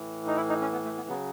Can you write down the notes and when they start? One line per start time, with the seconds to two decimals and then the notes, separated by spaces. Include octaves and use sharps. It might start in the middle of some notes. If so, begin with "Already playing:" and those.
Already playing: A2 E3
0.27 D#4
0.36 E4
0.49 D#4
0.61 C#4
0.72 B3
0.85 A3
0.97 B3
1.08 C#3 F#3 B3